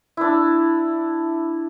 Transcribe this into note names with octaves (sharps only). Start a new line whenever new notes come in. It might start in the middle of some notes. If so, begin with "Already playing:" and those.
D4 E4